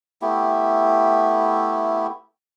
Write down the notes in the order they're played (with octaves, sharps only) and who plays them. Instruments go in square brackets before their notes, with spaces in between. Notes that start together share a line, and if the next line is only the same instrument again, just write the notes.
[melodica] A3 B3 E4 G4